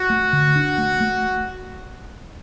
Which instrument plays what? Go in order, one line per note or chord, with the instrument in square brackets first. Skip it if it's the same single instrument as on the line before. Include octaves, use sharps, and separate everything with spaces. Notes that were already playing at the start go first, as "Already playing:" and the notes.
Already playing: [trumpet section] F#4
[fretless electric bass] A3
D3
D4
A3
A3